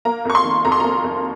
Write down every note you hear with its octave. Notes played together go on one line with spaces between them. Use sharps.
A#3 A#5
F2 C#6
C6
D#3
F2 A#5
C6
A#3 A#5
F2